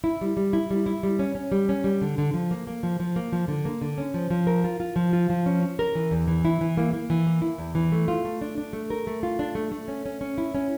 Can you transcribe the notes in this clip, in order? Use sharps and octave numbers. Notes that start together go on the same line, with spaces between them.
E4
G3
G3
E4
G3
E4
G3
C#4
C#4
G3
C#4
G3
D3
D3
F3
A#3
A#3
F3
F3
A#3
F3
D3
A#3
D3
C#4
F3
F3
A#4
F4
F4
F3
F4
F3
C#4
C#4
A#4
E3
E2
E3
E4
E3
A#3
A#3
E3
A#3
E4
E2
E3
A3
F4
A3
D4
D4
A3
A#4
A3
F4
D4
A3
A3
C#4
C#4
C#4
E4
C#4